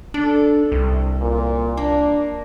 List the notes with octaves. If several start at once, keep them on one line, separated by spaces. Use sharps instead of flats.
D4 A4
C2
A#2
A#3 D4